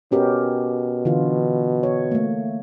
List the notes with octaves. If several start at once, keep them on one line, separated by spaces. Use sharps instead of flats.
B2 C#4 G4 A#4
D3 E3 F4
C#5
A3 A#3